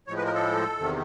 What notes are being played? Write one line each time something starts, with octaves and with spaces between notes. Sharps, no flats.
A2 F3 G#3 C#5
B4
A#4
A4
E2 C3 D#3